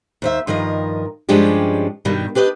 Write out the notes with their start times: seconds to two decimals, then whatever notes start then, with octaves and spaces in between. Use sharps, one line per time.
0.22 D#2 C5 E5
0.47 G2 D#3 F3 A#4 D#5
1.29 G2 F3 G#3 C#4 D4 G4
2.05 G2 B2 D#3 G3
2.35 D4 G4 B4 C#5 D#5